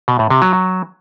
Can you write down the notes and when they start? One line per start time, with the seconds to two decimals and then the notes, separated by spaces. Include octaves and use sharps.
0.08 B2
0.19 A2
0.30 C3
0.42 F#3
0.53 F#3